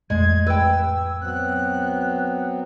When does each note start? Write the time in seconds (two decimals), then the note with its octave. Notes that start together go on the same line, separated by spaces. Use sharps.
0.10 A1 F2 G#3 A3 G#6
0.46 B4 G5 E6
1.21 F#3 B3 C4 F#6